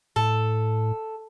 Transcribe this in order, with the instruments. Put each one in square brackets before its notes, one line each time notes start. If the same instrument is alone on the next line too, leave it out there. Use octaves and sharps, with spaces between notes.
[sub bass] A2 [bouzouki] A4